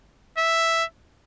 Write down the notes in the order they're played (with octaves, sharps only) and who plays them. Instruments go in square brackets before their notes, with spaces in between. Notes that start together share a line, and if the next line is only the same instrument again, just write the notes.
[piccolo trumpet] E5